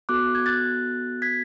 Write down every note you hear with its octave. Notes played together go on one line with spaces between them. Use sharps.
B3 F#4 A4 D6 F#6
G#6
F#6 A6
G#6 B6